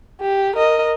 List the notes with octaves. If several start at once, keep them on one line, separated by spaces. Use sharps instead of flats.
G4
A#4 D#5